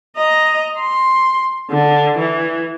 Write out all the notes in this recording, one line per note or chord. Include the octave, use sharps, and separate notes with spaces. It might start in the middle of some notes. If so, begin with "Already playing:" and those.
D#5 A#5
C6
D3
E3